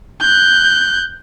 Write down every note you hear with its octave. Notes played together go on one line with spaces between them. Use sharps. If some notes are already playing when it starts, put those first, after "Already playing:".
F#6 G6